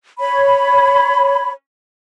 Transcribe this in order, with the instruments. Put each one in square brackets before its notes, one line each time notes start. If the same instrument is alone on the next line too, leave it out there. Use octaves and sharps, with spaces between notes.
[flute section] C#5 B5